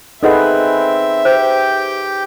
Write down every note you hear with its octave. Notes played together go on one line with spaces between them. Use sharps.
C4 D#4 G#4 A4 B4 D#5 E5 F#5
G4 C5 G5